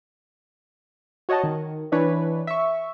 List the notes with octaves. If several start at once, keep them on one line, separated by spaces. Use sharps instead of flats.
F#4 C#5 D#5 F#5 A5
D#3
E3 D4 B4 C#5
E5 C#6